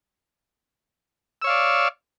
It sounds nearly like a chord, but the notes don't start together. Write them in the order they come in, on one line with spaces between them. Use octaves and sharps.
E6 C#5 F5 D5